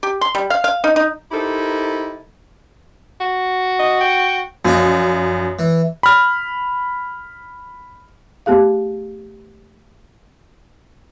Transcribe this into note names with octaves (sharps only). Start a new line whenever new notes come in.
G4
C6
G3
F5
F5
D#4
D#4
D#4 E4 G4 A4 A#4 C5
F#4
D#5
G5
F#2 F3 D4 D#4
E3
B5 F6
A3 B3 G4 G#4 F5